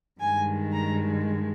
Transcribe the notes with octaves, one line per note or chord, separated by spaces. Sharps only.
G2 D#3 G#3 G#5
A#5